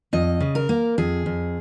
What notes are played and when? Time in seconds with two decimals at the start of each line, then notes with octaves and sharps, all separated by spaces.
0.13 F2 D#5
0.41 C#3
0.55 A#4
0.69 A#3
0.98 F2 G#4
1.26 F2